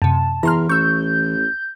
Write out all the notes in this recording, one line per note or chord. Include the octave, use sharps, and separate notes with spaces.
F#2 C3 A5
E2 E3 A#5 C6 F6
A1 C#6 E6 G6